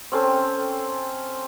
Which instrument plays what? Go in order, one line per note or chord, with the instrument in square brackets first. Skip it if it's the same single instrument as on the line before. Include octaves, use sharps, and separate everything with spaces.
[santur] C4 C#4 A4 C5